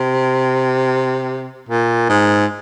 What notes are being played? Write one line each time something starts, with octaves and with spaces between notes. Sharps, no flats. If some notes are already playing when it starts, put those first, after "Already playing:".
Already playing: C3
A#2
G#2